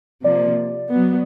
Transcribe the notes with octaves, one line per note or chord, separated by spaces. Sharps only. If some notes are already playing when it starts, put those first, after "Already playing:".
C3 F3 A#3 D5
F#3 B3